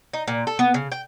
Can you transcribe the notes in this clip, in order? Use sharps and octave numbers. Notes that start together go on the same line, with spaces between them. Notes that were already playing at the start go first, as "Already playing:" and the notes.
D#4
A#2
A4
B3
C#3
G5